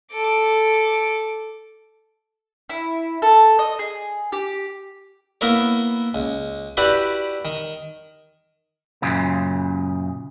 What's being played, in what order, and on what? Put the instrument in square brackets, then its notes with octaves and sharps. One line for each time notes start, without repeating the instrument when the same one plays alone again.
[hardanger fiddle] A4 D6
[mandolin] E4
A4
D#5
G#4
G4
[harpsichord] A#3 B3 E4 A#4 C#5
C#2
E4 F#4 G4 B4 D5 F#5
D#3
[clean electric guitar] F#2 A#2 C#3